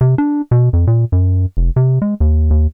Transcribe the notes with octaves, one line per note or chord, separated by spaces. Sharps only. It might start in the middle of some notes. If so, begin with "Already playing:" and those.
C3
D4
B2
F2
A#2
F#2
F1
C3
G#3
D#2
D#2